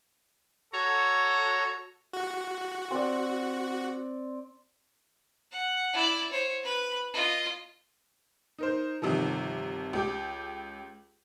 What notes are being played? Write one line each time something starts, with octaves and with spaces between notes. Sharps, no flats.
F#4 A4 C#5 A#5
F#4
C4 D5
F#5
E4 D5
C5 C#5
B4 B5
F4 D#5
D#4 A#4 C5
G1 C3 D#3 F3
C#2 G4 D6